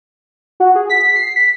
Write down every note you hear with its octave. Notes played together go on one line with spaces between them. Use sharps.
F#4
G#4
B6
C7
B6